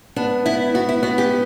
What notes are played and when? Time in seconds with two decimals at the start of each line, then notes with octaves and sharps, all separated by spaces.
0.16 B3 D4
0.45 B3 E4
0.74 B3 F#4
0.89 E4
1.03 B3 F#4
1.18 G4